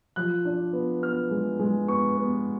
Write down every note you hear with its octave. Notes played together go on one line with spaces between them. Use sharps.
F3 F#6
D4
B3
B3 F6
G#3
G#3
B3 C#6
B3